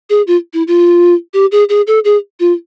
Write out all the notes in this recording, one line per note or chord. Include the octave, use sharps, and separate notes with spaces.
G#4
F4
E4
F4
G4
G#4
G#4
A4
G#4
F4